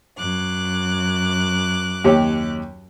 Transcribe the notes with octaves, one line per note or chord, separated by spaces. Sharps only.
F#2 D6 F#6
D#2 G4 C#5